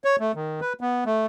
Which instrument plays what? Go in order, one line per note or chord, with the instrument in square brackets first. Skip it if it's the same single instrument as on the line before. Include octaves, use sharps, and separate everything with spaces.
[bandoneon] C#5
A3
D#3
B4
B3
A3